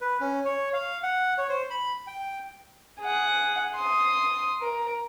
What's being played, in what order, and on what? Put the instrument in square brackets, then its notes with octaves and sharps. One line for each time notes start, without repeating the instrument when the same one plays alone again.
[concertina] B4
C#4
C#5
F5
F#5
C#5
C5
B5
G5
[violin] G#4 F#5
C6 D#6
A#4